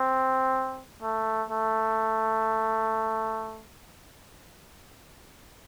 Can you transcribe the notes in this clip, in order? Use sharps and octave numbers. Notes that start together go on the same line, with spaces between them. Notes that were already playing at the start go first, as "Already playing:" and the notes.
Already playing: C4
A3
A3